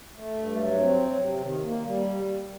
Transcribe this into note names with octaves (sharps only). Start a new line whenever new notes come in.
A3
G2
F#3
C4
F#3
C3
D#3
A#3
G3